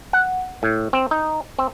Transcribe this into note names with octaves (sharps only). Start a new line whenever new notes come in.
F#5
A2
C4
D#4
C4